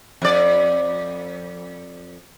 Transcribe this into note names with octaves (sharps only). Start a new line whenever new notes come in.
F2 D5